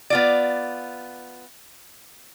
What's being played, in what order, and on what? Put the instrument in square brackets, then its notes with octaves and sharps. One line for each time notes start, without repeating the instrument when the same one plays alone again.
[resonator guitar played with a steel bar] B3 F4 D5